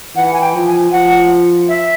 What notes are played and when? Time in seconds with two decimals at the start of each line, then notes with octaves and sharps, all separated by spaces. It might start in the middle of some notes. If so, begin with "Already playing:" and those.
0.16 E3 F#5
0.33 G#5
0.41 G5
0.54 F3
0.67 G#5
0.91 F3 F#5
1.68 E5